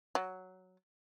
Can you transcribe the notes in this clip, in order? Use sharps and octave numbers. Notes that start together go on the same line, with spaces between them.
F#3